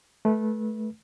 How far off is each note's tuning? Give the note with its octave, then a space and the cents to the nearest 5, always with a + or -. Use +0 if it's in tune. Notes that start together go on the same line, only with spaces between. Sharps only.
A3 -20 B4 -30